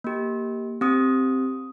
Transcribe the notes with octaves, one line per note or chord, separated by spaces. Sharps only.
A#3 G4
C4 G4 D#6